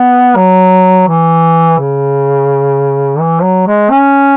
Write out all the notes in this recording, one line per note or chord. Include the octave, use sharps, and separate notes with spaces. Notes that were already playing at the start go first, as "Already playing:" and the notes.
Already playing: B3
F#3
E3
C#3
E3
F#3
G#3
C#4